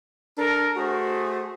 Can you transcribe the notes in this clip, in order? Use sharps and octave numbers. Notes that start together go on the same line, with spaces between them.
D4 A4 A#4
A3 F#4 G#4 C5